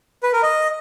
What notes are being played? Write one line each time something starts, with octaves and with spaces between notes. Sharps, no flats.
B4
A#4
D#5